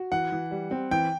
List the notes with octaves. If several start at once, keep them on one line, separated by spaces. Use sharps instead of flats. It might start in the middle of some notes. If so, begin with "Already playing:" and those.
Already playing: F#4
E3 F#5
E3
G3
C4
E3 G5